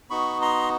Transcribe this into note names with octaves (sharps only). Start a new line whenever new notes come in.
B3 D#4 F#4 B5 C#6
A#5 C6